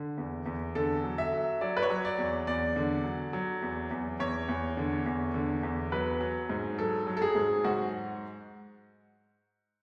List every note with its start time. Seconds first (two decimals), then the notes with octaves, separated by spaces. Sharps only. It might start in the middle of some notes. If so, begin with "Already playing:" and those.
Already playing: D3
0.18 E2
0.46 E2
0.75 D3 A4
1.04 F#3
1.18 E5
1.33 F#3
1.61 F#3 D5
1.77 B4
1.83 C#5
1.90 F#3
2.05 D5
2.18 E2
2.47 E2 D5
2.76 D3
3.04 F#3
3.33 F#3
3.62 E2
3.91 E2
4.20 E2 C#5
4.48 E2
4.77 D3
5.06 E2
5.34 D3
5.63 E2
5.92 F#3 B4
6.21 F#3
6.49 G#2
6.78 F#3 A4
7.07 F#3
7.17 A4
7.22 G#4
7.35 G#2
7.64 G#2 F#4